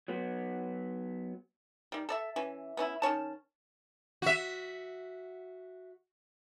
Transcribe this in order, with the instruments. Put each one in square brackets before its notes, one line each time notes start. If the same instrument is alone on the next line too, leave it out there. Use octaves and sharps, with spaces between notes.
[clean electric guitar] F#3 B3
[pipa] D#3 G3
A4 D5 E5
E3 C#4
B3 C#4 E4
D#3 C#4 C#5 A5
[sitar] F#4 E5